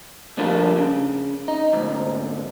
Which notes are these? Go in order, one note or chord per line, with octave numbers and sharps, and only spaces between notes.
D2 A#2 D3 F3 G3 A#3
C#3
D#4
D2 G#2